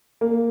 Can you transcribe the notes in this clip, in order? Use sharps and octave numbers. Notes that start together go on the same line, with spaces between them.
A#3